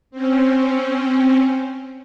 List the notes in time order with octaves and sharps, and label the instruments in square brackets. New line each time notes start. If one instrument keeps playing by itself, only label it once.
[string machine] C4 C#4